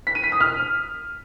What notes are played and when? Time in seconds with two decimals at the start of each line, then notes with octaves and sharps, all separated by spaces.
0.07 B6
0.15 D#7
0.24 B6
0.32 D#6
0.40 F6